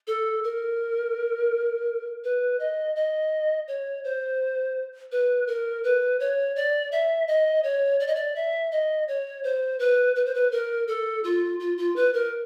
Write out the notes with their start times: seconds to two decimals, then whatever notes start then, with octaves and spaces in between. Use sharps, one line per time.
0.07 A4
0.44 A#4
2.24 B4
2.60 D#5
2.96 D#5
3.68 C#5
4.04 C5
5.12 B4
5.47 A#4
5.84 B4
6.20 C#5
6.56 D5
6.92 E5
7.28 D#5
7.64 C#5
8.00 D5
8.07 D#5
8.15 D5
8.36 E5
8.72 D#5
9.08 C#5
9.44 C5
9.79 B4
10.16 B4
10.25 C5
10.35 B4
10.52 A#4
10.88 A4
11.24 F4
11.60 F4
11.78 F4
11.96 B4
12.14 A#4